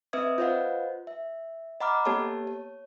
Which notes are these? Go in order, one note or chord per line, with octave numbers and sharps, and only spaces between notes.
C4 B4 D#5 E5 D#6 G#6
F4 B4 C5 D#5 F5 F#5
E5
D#5 F#5 A#5 B5 D6 F6
A#3 B3 G4 A4 C#5 A5
C#5